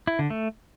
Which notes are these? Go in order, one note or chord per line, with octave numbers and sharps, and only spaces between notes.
E4
D3
A3